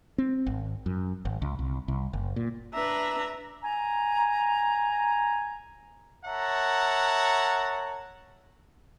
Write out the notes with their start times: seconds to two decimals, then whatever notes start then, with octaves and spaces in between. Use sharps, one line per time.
0.18 C4
0.47 G#1
0.86 F#2
1.25 G#1
1.42 C#2
1.59 C2
1.88 C2
2.13 F#1
2.36 A#2
2.74 D4 B4 E5 A#5
3.64 G#5 A#5
6.26 A#4 C#5 E5 F#5 A5 A#5